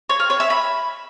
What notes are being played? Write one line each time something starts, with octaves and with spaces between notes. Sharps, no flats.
C#5
F5
C#5
E5
B5